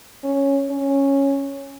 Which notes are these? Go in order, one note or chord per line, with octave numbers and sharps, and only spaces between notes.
C#4
C#4